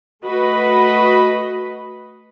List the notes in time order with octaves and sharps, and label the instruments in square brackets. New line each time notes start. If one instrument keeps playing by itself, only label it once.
[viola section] A3 F#4 B4 D#5 B5